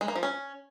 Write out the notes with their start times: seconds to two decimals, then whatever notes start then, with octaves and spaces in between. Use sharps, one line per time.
0.01 G#3
0.08 A#3
0.15 F3
0.23 C#4